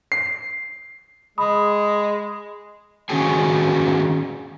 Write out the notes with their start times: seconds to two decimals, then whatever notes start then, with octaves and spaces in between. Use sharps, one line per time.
0.12 C7
1.38 G#3 B5 D#6
3.09 D#3 C#4 F#4 G#4 G#5